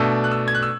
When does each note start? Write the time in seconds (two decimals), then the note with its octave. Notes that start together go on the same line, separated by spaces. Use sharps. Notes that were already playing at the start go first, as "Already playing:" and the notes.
Already playing: B2 A3 D4 E6
0.24 F#6
0.31 E6
0.48 G#6
0.55 F#6
0.63 E6